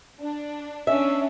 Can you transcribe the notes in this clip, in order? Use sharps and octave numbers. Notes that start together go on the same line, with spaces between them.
D4
C#4 D4 E5